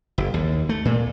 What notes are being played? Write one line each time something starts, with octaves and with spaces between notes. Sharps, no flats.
F#1
D#2
A3
A#2